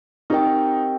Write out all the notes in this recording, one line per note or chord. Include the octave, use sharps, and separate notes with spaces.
C4 D#4 G4 A#4 D#5 G5